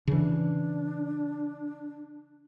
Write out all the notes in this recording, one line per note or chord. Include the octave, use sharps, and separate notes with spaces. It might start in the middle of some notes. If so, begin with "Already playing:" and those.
C#3 E3 D4